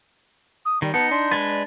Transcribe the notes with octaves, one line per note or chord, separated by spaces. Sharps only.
D#6
D#3 G3 D5
B3 D#4 A5 C#7
D4 C6
G#3 B4 A6
D5